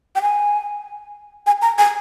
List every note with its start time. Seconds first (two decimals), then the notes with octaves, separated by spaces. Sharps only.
0.16 G5
0.22 G#5
1.47 G#5
1.62 A#5
1.78 G#5